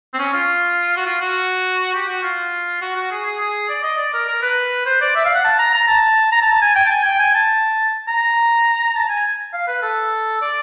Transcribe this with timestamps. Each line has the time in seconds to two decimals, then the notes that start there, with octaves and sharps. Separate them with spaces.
0.14 C4
0.19 C#4
0.34 F4
0.97 F#4
1.06 F4
1.21 F#4
1.94 G4
2.08 F#4
2.23 F4
2.82 F#4
2.96 F#4
3.11 G#4
3.26 G#4
3.40 G#4
3.69 D5
3.83 D#5
3.98 D5
4.14 A#4
4.28 A#4
4.42 B4
4.86 C5
5.01 D5
5.15 E5
5.25 F5
5.35 F#5
5.44 A5
5.59 A#5
5.74 A#5
5.88 A5
6.32 A#5
6.42 A5
6.52 A5
6.62 G#5
6.75 G5
6.85 A5
6.91 G#5
7.04 G5
7.19 G#5
7.34 A5
8.08 A#5
8.95 A5
9.09 G#5
9.53 F5
9.67 B4
9.82 A4
10.41 D5